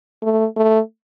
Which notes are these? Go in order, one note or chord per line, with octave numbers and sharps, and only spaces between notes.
A3
A3